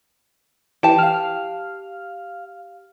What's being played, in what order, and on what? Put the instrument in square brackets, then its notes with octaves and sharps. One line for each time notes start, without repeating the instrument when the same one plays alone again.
[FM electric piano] E3 [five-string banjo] G4 A5
[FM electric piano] F5 F6